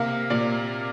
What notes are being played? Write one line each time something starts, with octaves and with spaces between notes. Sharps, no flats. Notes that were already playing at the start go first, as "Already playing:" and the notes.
Already playing: C3 A#3 F5
A#2 D5